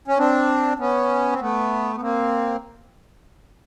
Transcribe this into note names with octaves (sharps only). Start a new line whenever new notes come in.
C#4
C4 D4
B3 C#4
C4
A3 B3
B3
A#3 C4